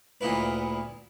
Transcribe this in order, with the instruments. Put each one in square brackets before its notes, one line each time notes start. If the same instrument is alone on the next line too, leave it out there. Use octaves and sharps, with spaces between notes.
[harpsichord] D2 A#2 D#4 E4 B4